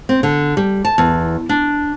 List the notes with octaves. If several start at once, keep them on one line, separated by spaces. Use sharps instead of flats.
C4
D3
G3
A5
E2
D4